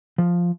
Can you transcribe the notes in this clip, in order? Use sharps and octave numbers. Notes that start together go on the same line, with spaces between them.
F3